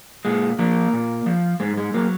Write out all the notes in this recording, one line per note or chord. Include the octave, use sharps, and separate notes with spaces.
A#2 G#3
F3 A#3
A#2
F3
G#2 G#3
G#3
F#3 A#3